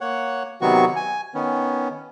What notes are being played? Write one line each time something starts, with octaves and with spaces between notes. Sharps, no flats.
A#3 C#5 F#5
C3 D#3 F#3 B3 F#4 C#6
G#5
D#3 B3 C#4